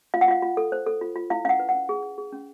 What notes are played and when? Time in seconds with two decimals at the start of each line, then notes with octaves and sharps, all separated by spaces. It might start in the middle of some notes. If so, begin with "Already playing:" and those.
0.14 F4 F5
0.21 F#5
0.28 F4 F5
0.42 F4
0.57 A4
0.72 C5
0.86 A4
1.01 F4
1.16 F4
1.30 E4 F5
1.45 C#4 F5
1.49 F#5
1.59 B4
1.69 F#5
1.74 C#4
1.89 G#4
2.03 G#4
2.18 G#4
2.33 C#4